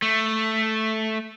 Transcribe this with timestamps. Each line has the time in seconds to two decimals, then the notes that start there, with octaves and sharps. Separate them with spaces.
0.02 A3